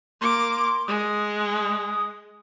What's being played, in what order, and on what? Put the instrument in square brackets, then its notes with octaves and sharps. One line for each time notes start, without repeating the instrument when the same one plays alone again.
[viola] A#3 D6 [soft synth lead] C6
[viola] G#3 [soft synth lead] D#6